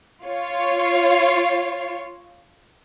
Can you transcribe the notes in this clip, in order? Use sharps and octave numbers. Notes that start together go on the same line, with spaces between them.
F4 C#5